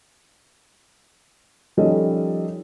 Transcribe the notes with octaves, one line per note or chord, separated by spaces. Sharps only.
D#3 F3 G3 C#4 A4 D#5